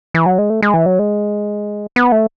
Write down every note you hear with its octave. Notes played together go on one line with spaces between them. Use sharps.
E3
F#3
G#3
A3
G#3
E3
F#3
G#3
B3
A3